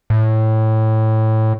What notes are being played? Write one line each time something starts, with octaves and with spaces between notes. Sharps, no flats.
A2